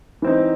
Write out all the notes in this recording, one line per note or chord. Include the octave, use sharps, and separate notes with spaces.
E3 C4 D#4